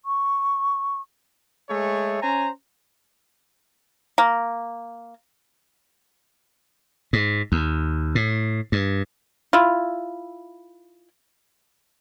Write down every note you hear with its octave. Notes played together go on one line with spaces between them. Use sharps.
C#6
G#3 A3 G#4 C#5 E5
C#4 C5 G#5 A#5
A#3
G#2
D#2
A2
G2
E4 F4